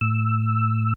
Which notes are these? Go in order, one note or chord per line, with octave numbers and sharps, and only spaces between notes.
A2 E6